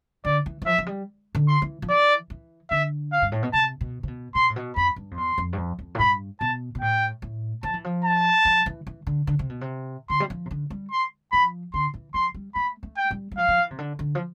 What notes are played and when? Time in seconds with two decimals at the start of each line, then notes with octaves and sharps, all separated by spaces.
0.25 D3 D5
0.46 E3
0.62 E3
0.66 F3 E5
0.78 F3
0.87 G3
1.35 D3
1.48 C6
1.62 E3
1.82 F3
1.89 E3 D5
2.30 E3
2.71 D3 E5
3.12 F5
3.22 G2
3.32 A2
3.43 B2
3.53 C3 A5
3.81 B2
4.03 C3
4.08 B2
4.35 B2 C6
4.50 A2
4.56 B2
4.76 F2 B5
4.96 G2
5.11 F2
5.17 E2 C6
5.38 F2
5.53 G2
5.58 F2
5.79 F2
5.95 A2
5.99 G2 B5
6.40 B2 A5
6.75 B2
6.81 A2 G5
7.22 A2
7.63 F3 A5
7.74 E3
7.84 F3
8.05 A5
8.45 F3
8.66 E3
8.87 E3
9.07 D3
9.27 D3
9.39 C3
9.50 B2
9.61 C3
10.10 D3 C6
10.20 G3
10.30 F3
10.46 C3
10.51 D3
10.70 G3
10.91 C6
11.32 F3 B5
11.74 D3 C6
11.94 E3
12.14 F3 C6
12.34 G3
12.55 A3 B5
12.83 A3
12.97 G5
13.11 G3
13.32 G3
13.38 F3 F5
13.48 F3
13.58 E3
13.71 C3
13.78 D3
13.99 D3
14.15 F3